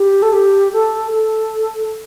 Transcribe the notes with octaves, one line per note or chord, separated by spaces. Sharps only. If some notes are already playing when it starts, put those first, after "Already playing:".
Already playing: G4
A4
G4
A4
A4